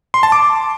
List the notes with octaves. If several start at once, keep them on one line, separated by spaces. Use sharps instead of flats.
C6
A5
D6